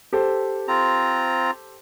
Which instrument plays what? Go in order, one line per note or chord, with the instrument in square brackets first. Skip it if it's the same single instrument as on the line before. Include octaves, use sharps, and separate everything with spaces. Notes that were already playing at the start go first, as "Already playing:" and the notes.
[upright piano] G4 A4 C5
[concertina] C4 F4 A#5